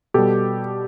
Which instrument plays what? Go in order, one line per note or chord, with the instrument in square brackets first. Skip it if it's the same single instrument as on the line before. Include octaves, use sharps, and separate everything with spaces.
[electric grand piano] B2 G3 G4 A4